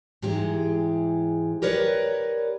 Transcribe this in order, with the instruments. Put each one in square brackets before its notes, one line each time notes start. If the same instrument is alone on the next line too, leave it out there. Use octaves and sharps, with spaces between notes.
[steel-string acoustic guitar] G#2 E3 G#3 G4 G#4
G4 A#4 B4 C#5 D5